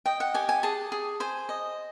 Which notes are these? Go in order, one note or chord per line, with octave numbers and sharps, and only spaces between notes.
D#5 G5
F#5
G4 G#5
G#5
G#4 A5
G#4
C5 G#5
D#5